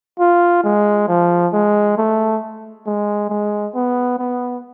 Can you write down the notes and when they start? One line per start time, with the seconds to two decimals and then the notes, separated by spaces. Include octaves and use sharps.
0.19 F4
0.63 G#3
1.08 F3
1.53 G#3
1.98 A3
2.86 G#3
3.29 G#3
3.75 B3
4.19 B3